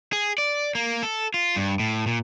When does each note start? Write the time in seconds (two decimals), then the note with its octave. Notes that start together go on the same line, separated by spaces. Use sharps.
0.13 G#4
0.38 D5
0.75 A#3
1.03 A4
1.34 F4
1.56 G2
1.80 A2
2.07 A#2